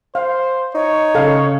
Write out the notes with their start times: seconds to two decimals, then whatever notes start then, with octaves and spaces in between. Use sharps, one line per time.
0.15 C5 F5
0.75 D#4 C#5
1.15 C#3 A4 F5